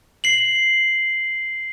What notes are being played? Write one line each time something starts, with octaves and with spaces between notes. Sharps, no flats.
C7 F#7